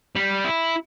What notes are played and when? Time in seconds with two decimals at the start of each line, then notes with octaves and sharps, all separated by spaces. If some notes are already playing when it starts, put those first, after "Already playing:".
0.15 G3
0.45 E4